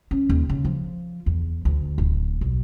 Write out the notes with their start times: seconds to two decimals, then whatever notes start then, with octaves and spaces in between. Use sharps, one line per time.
0.11 C#4
0.29 D#2
0.49 C#3
0.65 F3
1.26 E2
1.65 D2
1.98 D1
2.41 B1